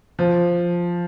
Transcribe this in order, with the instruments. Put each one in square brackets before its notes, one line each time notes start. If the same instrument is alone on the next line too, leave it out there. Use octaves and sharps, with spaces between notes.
[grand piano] F3